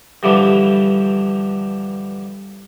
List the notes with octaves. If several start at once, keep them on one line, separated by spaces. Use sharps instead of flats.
G2 D3 E3 F3 G3